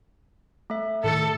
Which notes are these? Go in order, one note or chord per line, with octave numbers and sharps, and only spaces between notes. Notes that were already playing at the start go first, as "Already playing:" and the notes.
A3 E5
A2 D#3 A4